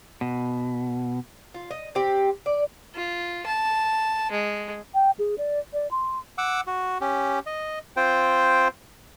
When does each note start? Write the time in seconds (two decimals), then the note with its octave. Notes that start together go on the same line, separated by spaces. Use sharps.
0.21 B2
1.55 F4
1.71 D#5
1.95 C4 G4
2.46 D5
2.95 F4
3.46 A5
4.31 G#3
4.94 G5
5.19 G#4
5.38 D5
5.73 D5
5.91 C6
6.38 F#5 D6 E6
6.67 F#4
7.01 C#4 G4
7.46 D#5
7.97 C4 F4 C5 G5